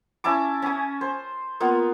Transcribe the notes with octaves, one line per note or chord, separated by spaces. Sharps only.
C#4 E4 A5 D6
C#4 D#6
C5
A#3 B3 F4